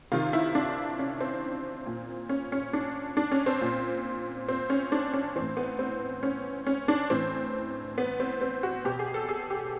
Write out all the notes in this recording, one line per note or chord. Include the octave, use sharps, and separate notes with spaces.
C3 D#3 F4
E4
D4
C#4
C4
A#2
C#4
C#4
D4
D4
C#4
C4
A#2
C4
C#4
D4
C#4
A2 E3 C4
B3
C4
C#4
C#4
D4
A2 E3 C4
B3
C4
C4
F#4
B2 G4
G#4
A4
G#4
G4